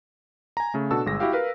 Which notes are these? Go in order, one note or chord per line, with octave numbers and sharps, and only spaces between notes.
G#5 A#5
C#3 A3
B2 D4 F#4 A4 A5 E6
G1 G#3 A#6
E4 F#4 G4 F5 G5
A#4 B4 F5